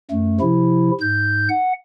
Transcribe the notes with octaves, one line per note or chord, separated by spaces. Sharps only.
F#2 A3
C3 F3 E4
G#2 G6
F#5